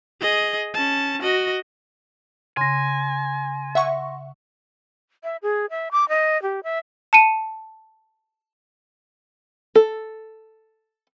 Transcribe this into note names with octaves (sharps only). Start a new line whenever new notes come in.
G#4 D#5
C#4 A5
F#4 D#5
C#3 G#5 C6 A#6
E5 F#5 C#6
E5
G#4
E5
D6
D#5
G4
E5
A5 C#7 D#7
A4